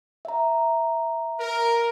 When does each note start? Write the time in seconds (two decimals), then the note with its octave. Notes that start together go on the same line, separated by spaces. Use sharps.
0.25 E5 A#5
1.40 A#4